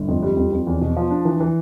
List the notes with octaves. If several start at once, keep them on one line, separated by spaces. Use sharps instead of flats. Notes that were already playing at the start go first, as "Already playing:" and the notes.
Already playing: G1
F2
G3
F2
F2
E2
B2
F3
D4
E3
E3